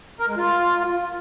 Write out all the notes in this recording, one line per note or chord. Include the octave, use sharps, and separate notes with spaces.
A#4
G#3
F4